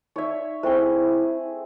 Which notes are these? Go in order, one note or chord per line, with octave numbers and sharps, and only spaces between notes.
D#4 C#5 D5 E5
A3 C4 E4 G#4 C5 G5 C#6